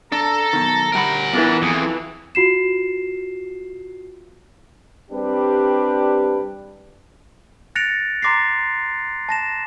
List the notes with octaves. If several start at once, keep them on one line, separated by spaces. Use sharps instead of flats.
D4 A4 A#5
B1 B2 D#3
D2 G3 A#4 F#5 B5
E3 B3 D4 F4
F2 G#4
F4 F#4 C7 E7
G3 C4 D4 G4 B4
F#6 A6 A#6 C#7 D7 F7
A#5 C6 D6 A6 A#6 C7
A5 A#6 E7